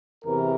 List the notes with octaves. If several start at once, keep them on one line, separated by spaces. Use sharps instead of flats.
E2 C3 E3 A#4